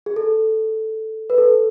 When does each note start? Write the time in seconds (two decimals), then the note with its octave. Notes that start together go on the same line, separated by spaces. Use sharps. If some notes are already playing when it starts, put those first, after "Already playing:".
0.06 G#4
0.16 A4
1.30 B4
1.38 A4